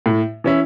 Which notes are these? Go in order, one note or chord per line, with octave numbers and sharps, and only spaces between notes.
A2
E3 C#4 E4